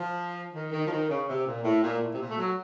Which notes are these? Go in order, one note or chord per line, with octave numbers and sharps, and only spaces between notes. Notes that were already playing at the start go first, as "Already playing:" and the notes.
Already playing: F3
D#3
D#3
F3
D#3
C#3
C3
A#2
A2
A#2
A2
C3
A#2
A3
F#3